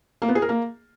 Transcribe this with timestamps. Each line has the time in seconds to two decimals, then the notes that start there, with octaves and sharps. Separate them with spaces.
0.22 A#3
0.29 B3
0.35 G#4
0.42 A#4
0.49 A#3